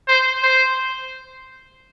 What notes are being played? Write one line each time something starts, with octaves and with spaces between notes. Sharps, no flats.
C5
C5